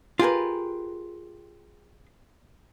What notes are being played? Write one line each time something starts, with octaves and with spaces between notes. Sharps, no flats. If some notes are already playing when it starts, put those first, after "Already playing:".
F4 G4 G#4 A#4 B4